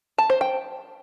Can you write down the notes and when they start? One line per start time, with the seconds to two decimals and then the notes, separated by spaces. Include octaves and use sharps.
0.18 A5
0.30 C5
0.41 G5